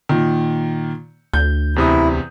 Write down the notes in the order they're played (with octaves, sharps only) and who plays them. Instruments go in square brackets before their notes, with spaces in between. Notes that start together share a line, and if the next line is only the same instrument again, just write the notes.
[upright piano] A#2 D#3
[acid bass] D2 [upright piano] G6
[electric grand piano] E2 C3 D#6 [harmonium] E4